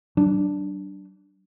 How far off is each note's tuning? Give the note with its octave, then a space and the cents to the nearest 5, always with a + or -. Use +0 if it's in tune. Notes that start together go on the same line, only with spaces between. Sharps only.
F#3 +45 D4 +0